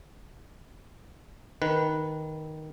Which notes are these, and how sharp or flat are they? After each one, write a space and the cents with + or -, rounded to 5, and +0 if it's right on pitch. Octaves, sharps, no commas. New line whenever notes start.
D#3 +0 B4 -10